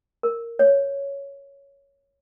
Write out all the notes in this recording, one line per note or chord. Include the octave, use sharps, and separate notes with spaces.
A#4
C#5